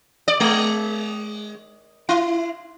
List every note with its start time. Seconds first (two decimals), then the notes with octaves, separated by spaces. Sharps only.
0.28 D5
0.40 G#3
2.09 E4